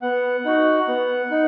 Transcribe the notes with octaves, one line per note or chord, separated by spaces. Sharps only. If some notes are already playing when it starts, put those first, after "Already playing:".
B3 F#5
D#4 F#4
B3
D#4